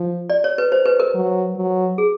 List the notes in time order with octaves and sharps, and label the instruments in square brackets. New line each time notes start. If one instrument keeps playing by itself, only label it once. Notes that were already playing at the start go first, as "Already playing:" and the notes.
Already playing: [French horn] F3
[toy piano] D5
C#5
B4
C5
B4
A#4
[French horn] F#3
F#3
[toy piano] G#4